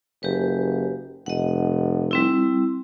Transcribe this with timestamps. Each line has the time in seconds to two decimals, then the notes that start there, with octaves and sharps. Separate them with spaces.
0.23 F#1 G4 B4
1.26 F1 D#5 F#5
2.11 G3 C4 E4